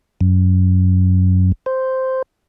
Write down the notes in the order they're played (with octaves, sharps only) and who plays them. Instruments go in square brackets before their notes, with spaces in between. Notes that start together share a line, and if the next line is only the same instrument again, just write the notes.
[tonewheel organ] F#2
C5